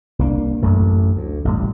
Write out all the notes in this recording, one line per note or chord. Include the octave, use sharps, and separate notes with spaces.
C2 A#3 D4
A1 F#2 A3
D2
A1 A2 G3